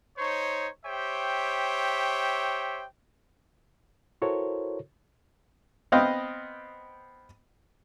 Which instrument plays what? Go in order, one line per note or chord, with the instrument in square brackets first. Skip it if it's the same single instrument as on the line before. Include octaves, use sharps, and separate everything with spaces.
[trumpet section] D#4 C5 C#5
G4 C5 C#5 E5 G5
[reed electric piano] E4 F#4 A4 A#4 C5 C#5
[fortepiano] B3 C4 D#5 F5 G5